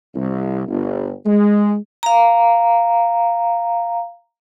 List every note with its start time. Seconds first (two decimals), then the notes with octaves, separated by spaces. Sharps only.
0.15 C2
0.68 G1
1.26 G#3
2.03 F5 A#5